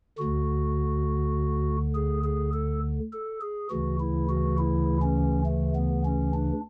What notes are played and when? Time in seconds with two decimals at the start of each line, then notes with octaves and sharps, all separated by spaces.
0.18 D2 D3 F#4
1.95 G#4
2.24 G#4
2.53 A4
3.12 A4
3.41 G#4
3.70 D2 C#3 E3 F#4
4.00 E4
4.29 F#4
4.58 E4
5.02 C#4
5.46 A3
5.75 B3
6.05 C#4
6.34 D4